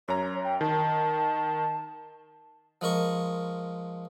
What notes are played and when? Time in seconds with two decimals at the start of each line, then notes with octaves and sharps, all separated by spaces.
0.08 F#2 C#5 A#5
0.45 G5
0.61 D#3 A5
2.81 F3 G#3 A#4 C#6